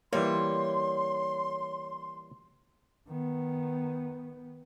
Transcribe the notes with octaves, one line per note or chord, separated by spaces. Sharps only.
E3 G3 A#3 C#5 C6
D#3 B3